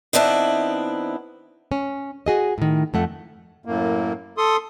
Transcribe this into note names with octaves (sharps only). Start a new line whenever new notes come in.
D#3 B3 C4 D4 E4
C#4
F#4 G#4 D#5
A2 D#3
F2 A3 F#5
F#2 A2 A#3
A4 C6 D#6